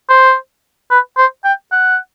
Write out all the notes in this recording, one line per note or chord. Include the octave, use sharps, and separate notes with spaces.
C5
B4
C5
G5
F#5